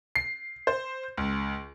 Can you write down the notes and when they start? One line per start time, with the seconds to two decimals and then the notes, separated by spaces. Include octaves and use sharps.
0.16 C7
0.67 C5
1.17 C#2